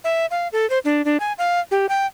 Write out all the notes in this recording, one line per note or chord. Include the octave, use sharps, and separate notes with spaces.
E5
F5
A4
C5
D4
D4
G#5
F5
G4
G5